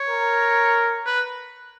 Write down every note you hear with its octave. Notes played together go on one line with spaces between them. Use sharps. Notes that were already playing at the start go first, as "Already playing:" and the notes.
Already playing: C#5
A#4
B4